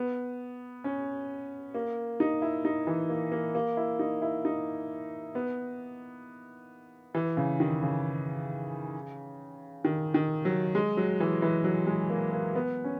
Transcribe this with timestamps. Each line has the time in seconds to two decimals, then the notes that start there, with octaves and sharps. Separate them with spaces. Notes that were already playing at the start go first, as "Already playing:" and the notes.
Already playing: B3
0.84 C#4
1.74 A#3
2.20 D#4
2.42 E4
2.65 D#4
2.87 E3
3.09 A#3
3.32 A#3
3.55 A#3
3.77 E4
3.99 D#4
4.22 E4
4.45 D#4
5.35 B3
7.15 E3
7.37 C#3
7.60 D#3
7.83 C#3
9.85 D#3
10.14 D#3
10.45 F#3
10.75 G#3
10.97 F#3
11.20 E3
11.42 E3
11.64 F#3
11.87 G#3
12.10 A#3
12.32 A#3
12.55 B3
12.84 C#4